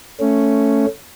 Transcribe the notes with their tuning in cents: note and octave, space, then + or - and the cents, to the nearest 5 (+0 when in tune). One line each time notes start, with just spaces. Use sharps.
A3 +5 C#4 +0